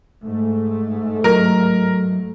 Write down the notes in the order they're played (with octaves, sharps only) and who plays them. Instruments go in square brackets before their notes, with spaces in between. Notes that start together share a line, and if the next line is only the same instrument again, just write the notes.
[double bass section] G#2 A3
[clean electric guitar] F#3 D#5 [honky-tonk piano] A#4